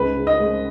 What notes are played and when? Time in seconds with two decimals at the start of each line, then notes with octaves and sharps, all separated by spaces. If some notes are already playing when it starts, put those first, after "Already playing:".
Already playing: C#2 G#2 B4
0.16 C#3
0.27 D#5
0.39 G#3